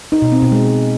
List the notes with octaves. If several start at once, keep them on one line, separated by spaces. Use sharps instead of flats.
D#4
B2
C4
B2
G#3